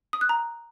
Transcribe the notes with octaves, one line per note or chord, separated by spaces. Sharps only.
D#6
F#6
A#5